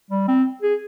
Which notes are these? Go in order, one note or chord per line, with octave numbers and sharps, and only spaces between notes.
G3
C4
G#4